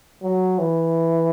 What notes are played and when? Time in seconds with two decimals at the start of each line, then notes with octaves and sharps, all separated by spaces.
0.23 F#3
0.59 E3